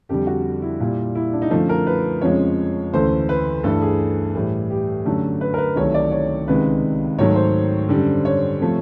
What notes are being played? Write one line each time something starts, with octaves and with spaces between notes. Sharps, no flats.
F2 D3 G3 G4
F#4
E4
A#2 G3
E4
D4
D#4
F#2 D3 F3 A3
A#4
B4
F2 C#3 F3 G#3 C#5
D2 C#3 E3 A3 C5
B4
G2 E3 A3 A4
G#4
A2 E3 G3
G4
F#2 D3 F#3 A3
B4
A#4
B4
C2 C3 D#3 F#3 A3 C#5
D5
C#5
C#2 C3 D#3 G#3 B4
G#2 D#3 F#3 A3 C#5
C5
F#2 D3 G3
C#5
C3 F3 A3